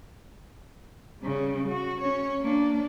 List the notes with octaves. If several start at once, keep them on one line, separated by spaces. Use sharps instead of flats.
C#3 G3
F#4
C#4 C#5
A#3 D4